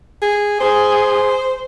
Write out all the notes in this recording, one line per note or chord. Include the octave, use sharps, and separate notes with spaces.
G#4
G#4 C5